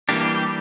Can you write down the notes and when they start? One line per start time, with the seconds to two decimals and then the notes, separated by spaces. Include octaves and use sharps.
0.09 E3 G3 A#3 D4 G4
0.21 G4
0.35 G4